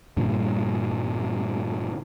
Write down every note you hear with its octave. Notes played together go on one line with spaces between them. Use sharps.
G2 A#2 D3 G3